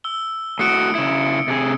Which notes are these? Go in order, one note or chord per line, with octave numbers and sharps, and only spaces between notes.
E6 G7
A2 F#4 D#6 C#7 D7
C#3 E4
C3 G#4